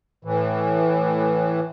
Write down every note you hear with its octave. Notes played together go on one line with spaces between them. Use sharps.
A2 E3